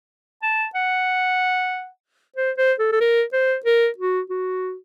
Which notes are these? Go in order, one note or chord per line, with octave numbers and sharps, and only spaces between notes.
A5
F#5
C5
C5
A4
A4
A#4
C5
A#4
F#4
F#4